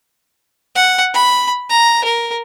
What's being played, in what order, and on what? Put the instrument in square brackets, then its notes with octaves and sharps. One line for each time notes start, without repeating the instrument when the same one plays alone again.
[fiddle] F#5
B5
A#5
A#4